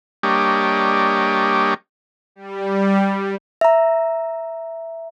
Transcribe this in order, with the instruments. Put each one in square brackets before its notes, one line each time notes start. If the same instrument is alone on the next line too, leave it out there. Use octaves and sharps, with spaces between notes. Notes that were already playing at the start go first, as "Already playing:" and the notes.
[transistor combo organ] G3 A#3 D4 G4 C#5 D#5
[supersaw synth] G3
[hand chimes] E5 A#5